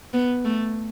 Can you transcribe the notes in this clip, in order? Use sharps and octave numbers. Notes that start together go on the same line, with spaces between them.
B3
A3